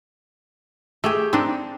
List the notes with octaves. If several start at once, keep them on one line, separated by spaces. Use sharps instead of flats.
A3 G4 G#4 G5
C4 D4 D#4